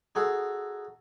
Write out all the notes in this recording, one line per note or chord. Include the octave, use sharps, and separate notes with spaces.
D#4 F#4 G#4 A4